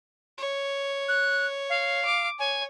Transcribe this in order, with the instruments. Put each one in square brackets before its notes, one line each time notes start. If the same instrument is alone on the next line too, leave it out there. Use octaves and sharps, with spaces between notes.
[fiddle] C#5
[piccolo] F#6
F5
[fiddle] D6
[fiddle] C#5 [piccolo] G#5